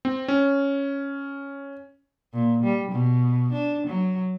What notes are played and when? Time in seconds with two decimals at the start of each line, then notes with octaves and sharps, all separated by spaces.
0.05 C4
0.28 C#4
2.34 A#2
2.63 G3
2.92 B2
3.53 D4
3.87 F#3